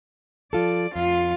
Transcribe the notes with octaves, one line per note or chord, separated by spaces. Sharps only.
F3 F4 A4 D5
F2 F4